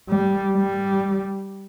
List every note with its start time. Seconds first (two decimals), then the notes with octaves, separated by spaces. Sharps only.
0.09 G3
0.54 G3